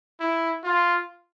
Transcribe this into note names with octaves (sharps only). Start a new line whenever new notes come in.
E4
F4